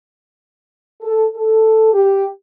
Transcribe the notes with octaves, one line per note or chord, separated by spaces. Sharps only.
A4
A4
G4